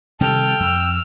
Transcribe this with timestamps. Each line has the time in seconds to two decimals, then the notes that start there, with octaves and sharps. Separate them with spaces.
0.21 C3 D#3 G3 A4 G5 F6
0.60 F2 E6